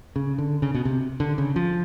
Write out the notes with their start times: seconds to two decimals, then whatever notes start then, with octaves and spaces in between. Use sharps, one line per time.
0.16 C#3
0.38 D3
0.62 C#3
0.74 B2
0.85 C3
1.20 D3
1.38 C#3
1.56 F3